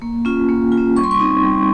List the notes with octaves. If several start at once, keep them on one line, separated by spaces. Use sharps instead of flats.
A#3
C#4 F4
A#3
F4
C#4
G3 C#6
C6
C#6
C4 D#4
G3